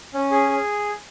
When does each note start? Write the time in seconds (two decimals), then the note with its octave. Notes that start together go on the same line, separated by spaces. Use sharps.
0.14 C#4
0.31 G#4
0.49 G#4